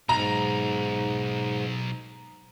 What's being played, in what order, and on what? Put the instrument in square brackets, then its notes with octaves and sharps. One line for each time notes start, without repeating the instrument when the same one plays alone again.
[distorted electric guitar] B1 [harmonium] G#2 [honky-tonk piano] A#5